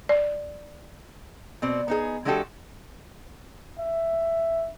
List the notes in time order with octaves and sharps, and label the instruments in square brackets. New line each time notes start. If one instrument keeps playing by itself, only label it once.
[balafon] D5
[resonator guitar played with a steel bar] B2 C4 D5
B3 D#4 G#4
E3 G#3 D4 F#4 G4 A4
[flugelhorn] E5